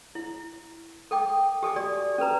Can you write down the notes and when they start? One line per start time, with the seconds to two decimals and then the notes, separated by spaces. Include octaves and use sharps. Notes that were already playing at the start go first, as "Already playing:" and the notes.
0.15 E4
1.11 A4 G5 D6
1.63 G4 A4 G#5 D6
1.76 F#4 G4 D5
2.18 C#4 A4 B4 A#5